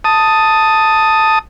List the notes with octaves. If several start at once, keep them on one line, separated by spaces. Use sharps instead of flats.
A5 D#6